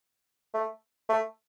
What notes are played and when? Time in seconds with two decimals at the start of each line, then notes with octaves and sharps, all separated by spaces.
0.54 A3
1.09 A3